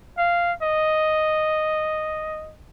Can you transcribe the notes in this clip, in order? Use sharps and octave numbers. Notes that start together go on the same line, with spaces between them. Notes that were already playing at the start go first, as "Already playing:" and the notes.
F5
D#5